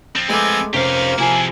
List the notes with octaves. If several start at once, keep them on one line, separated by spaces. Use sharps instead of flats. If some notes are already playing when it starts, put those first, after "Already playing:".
F3 C4 A6
G#3 A3 B3 G#5 D6 E6
F1 A#3 C#4 G4 C5 F5
C3 F3 E4 G#4 G#5